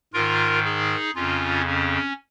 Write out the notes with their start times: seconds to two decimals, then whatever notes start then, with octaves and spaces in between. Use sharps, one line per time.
0.13 G#2 D#3 F4 A#4
0.64 D#4 G#4
1.15 F2 C#3 C#4 F4
1.67 C#4